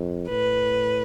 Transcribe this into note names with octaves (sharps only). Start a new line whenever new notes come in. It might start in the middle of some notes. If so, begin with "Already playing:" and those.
Already playing: F2
A2 B4